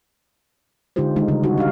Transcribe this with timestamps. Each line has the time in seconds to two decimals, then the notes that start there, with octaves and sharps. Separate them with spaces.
0.96 D3 G#3 D#4 F4 G4 C5
1.16 D#3 G#3 D#4
1.28 C#3 G3 G#3
1.43 G3 D#4 F#4
1.58 D4 G4 F5